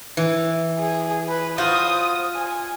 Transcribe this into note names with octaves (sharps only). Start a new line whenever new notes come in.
E3
G#4
B4
F4 F#4 C5 D#6
G#5